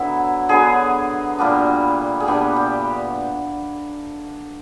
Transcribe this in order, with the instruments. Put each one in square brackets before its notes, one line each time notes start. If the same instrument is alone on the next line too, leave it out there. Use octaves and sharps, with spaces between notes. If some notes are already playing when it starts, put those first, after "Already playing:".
Already playing: [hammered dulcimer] D3 F#3 B3 E4
D3 F#3 B3 G#4
A#2 G3 B3 D4
G#4
A#2 G3 B3 D4 G4
G4